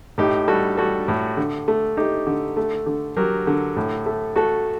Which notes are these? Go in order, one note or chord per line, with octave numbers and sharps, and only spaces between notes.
A2 D#4 G4
G3 F#4 A4
G3 F#4 A4
A2
D3
A3
A3 D#4 G4
D3
A3
D3
F#3 G4 A#4
D3
A2
A3
A3 F#4 A4